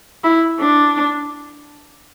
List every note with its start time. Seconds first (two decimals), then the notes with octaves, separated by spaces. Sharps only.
0.24 E4
0.59 D4